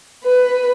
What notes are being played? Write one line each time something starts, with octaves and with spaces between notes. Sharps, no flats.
B4